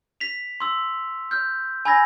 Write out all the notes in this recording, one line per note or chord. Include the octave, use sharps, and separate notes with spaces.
B6 F7
C6 E6
F6 G6
G#5 B5 E6 G#6 A#6